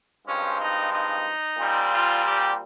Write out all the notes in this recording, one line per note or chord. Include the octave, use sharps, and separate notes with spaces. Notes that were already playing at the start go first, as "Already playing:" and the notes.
G2 F3 G#3 C4 C#4
D#4
D#4
A#2 G3 C4
F4
G4